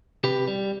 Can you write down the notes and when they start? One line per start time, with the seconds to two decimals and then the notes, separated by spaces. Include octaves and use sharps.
0.24 C3 G4 B4
0.48 G3